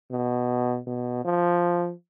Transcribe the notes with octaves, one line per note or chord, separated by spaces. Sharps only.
B2
B2
F3